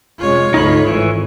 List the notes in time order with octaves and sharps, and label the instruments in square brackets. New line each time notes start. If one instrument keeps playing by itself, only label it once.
[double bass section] F1 G#3 C#4 [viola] F4 C#5
[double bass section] D2 G#2 A3 [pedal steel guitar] D#4 B5
[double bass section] G#1 [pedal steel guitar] E3